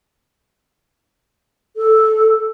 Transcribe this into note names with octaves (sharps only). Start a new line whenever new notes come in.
A4